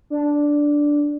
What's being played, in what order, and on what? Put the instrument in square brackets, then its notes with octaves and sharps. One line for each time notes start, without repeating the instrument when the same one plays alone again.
[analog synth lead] D4